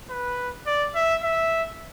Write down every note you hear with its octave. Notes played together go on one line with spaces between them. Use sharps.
B4
D5
E5
E5